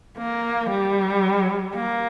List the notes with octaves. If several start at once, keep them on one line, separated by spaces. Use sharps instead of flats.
A#3
G3
A#3